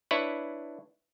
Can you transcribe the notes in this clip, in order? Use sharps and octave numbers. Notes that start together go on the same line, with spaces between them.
D4 E4 B4 C#5